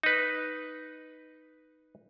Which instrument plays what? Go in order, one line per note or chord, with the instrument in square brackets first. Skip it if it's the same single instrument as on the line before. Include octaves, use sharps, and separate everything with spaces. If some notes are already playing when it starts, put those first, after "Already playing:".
[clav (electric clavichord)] D#4 B4